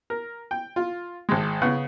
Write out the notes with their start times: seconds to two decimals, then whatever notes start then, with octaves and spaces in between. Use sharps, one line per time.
0.10 A#4
0.51 G5
0.76 F4
1.29 G#1 G#3
1.62 C#3 B3 F#5